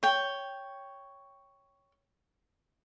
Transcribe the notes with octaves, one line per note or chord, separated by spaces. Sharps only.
C#5 G5